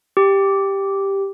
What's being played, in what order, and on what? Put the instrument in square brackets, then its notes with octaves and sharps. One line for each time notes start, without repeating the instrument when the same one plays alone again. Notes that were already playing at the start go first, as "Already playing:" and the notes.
[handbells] G4